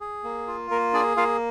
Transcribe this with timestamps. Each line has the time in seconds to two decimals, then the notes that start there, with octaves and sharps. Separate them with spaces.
0.01 G#4
0.24 A#3
0.47 F4
0.70 A#3 A#4
0.93 D4 G#4 D5
1.17 A#3 F4 F5